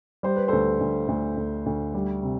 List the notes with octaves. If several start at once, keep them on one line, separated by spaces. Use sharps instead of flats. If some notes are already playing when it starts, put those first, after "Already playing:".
G3 C5
B4
D2 A4 C5
D2
D2
D2
D2
G3
C3